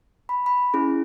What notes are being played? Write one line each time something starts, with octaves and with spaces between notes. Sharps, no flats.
B5
B5
C#4 E4 G#4